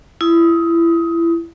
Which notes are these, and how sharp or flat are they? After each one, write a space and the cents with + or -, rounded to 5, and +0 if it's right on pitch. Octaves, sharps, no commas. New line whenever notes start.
E4 +25 D#6 +25